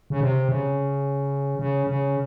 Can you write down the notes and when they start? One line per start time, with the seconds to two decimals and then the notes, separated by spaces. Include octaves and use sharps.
0.10 C#3
0.21 C3
0.49 C#3
1.59 C#3
1.87 C#3